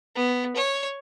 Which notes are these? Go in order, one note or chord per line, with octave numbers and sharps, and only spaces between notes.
B3
C#5